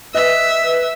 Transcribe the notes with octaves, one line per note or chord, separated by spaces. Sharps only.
B4 D#5 E5